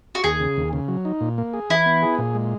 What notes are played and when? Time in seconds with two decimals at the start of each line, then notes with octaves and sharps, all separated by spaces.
0.15 F#4
0.24 D#2 G#4
0.40 C#3
0.57 D#2
0.73 C#3
0.88 F#3
1.05 D#4
1.21 A#2
1.38 A#3
1.53 G#4
1.70 E3 E4
1.86 B3
2.02 G#4
2.18 A#2
2.35 G#3